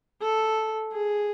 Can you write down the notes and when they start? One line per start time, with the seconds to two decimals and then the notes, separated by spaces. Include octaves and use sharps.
0.21 A4
0.92 G#4